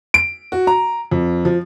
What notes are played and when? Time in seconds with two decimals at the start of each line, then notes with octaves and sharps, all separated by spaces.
0.14 D7
0.52 F#4
0.67 A#5
1.11 F2
1.45 F3